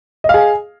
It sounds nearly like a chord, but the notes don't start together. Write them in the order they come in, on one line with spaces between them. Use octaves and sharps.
D#5 F5 G#4